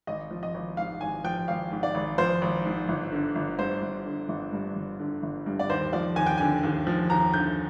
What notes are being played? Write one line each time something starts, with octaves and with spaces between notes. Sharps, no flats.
G#1 D#5
F3
D#5
G#1
G#2 F5
G#1 G#5
F3 G5
G#1 F5
G#2
D5
G#1
F3 C5
G#1
G#2
G1
D3
G1
G2 C5
G1
D3
G1
G2
G1
D3
G1
G2
D5
D#2 C5
F3 D5
D#2 G#5
G5
D3 G#5
D#2
F3
D#2 A#5
D3 G6